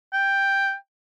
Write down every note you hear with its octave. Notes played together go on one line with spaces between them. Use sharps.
G5